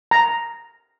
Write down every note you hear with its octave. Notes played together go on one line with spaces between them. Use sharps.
A#5